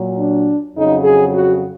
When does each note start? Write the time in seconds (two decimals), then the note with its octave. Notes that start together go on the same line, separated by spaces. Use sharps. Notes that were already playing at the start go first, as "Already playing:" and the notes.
Already playing: A#2 F#3
0.18 D4
0.75 F2 C#3 F#3 D#4
1.04 G#4
1.33 F#4